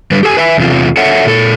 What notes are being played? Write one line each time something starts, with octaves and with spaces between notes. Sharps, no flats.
D3 G3 B4
G4 A4 G#5
B4 E5 G#5
E2 C3 F4
A4 C#5 E5 F#5
A#2 A4